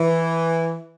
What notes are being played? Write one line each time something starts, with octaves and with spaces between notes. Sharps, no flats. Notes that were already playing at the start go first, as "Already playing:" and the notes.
Already playing: E3